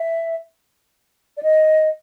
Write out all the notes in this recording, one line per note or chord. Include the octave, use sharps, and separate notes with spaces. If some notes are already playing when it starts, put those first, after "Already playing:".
Already playing: E5
D5
D#5